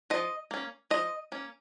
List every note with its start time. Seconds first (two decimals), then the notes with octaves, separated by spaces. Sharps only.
0.10 F3 D#5
0.51 A#3 C#4
0.90 F3 D#5
1.32 A#3 C#4